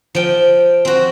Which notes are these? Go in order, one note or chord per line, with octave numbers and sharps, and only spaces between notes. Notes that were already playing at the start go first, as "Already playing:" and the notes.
F3 G5
C4 F#4